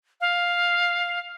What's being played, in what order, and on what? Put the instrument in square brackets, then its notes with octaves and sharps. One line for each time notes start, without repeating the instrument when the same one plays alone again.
[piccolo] F5